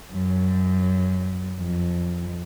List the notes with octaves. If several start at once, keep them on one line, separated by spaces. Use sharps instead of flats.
F#2
F2